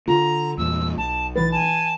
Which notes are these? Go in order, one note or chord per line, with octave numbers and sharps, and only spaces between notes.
D3 F4 A#5
E2 A#2 E6
B1 A5
E3 B4 A6
G#5 A5